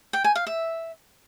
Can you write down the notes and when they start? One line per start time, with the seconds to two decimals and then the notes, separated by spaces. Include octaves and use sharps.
0.13 G5
0.24 G#5
0.35 F5
0.47 E5